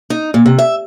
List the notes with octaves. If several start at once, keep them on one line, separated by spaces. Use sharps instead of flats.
D#4
A#2
C3
E5